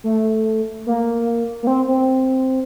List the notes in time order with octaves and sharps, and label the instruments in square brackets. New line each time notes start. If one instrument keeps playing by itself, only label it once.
[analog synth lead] A3
A#3
A#3
C4
C4